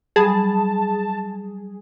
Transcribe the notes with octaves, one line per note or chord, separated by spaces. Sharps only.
F#3 G3 G#4 A5 B5